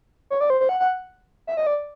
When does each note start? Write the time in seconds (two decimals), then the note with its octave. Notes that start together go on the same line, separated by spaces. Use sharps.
0.30 C#5
0.41 D5
0.50 C5
0.60 C5
0.69 F#5
0.80 F#5
1.47 E5
1.57 D#5
1.67 D5